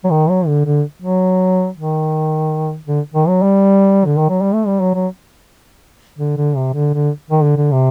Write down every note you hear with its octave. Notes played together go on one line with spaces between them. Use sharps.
F#3
D#3
F#3
D3
D3
F#3
D#3
D3
D#3
F#3
G3
D3
D#3
F#3
G3
A3
G3
F#3
F#3
D3
D3
C3
D3
D3
D#3
D3
D3
C3